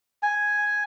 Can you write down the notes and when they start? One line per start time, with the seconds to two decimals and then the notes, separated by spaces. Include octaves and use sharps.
0.23 G#5